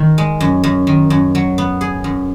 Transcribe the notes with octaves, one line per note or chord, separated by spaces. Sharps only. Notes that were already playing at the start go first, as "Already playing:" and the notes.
Already playing: D#3
G#3
F#2
F#2
D#3
F#2
F#3
B3
G#4
F#2